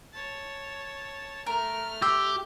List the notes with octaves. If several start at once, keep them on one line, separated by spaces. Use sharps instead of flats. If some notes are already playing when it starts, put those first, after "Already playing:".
C#5 A5
A3 A#4 F6
G4 C6 D6 E6